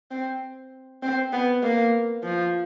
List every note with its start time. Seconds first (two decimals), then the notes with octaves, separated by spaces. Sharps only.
0.11 C4
1.02 C4
1.32 B3
1.62 A#3
2.24 F3